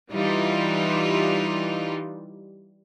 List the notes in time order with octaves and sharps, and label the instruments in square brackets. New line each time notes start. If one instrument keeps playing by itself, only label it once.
[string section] E3 G3 D#4 F4